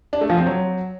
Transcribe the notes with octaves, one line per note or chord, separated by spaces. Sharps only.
D4
A3
F3
C4
F#3